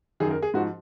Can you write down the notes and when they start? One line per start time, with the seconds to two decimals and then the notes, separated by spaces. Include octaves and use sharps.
0.20 F#2 D#3 G#4
0.31 A#4
0.42 G#4
0.54 G#2 F3 F#4